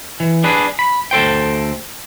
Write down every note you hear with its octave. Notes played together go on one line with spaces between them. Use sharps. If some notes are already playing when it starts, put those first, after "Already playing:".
E3
D4 G#4 B4
B5
D2 A4 C5 G5